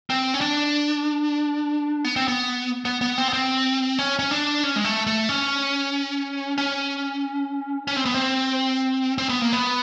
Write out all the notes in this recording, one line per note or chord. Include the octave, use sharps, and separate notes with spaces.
C4
C#4
D4
B3
C4
B3
B3
B3
C4
B3
C4
C#4
C#4
D4
C#4
G#3
A3
A3
C#4
C#4
C#4
C4
B3
C4
C4
B3
A#3
B3